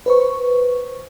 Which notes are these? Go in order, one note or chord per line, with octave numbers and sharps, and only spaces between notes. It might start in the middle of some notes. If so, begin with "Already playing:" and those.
B4 C5 C#6